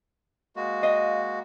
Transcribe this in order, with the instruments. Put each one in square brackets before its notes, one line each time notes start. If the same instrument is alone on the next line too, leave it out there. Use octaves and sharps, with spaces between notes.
[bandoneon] G#3 A#3 F#4
[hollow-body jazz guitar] D#5 F5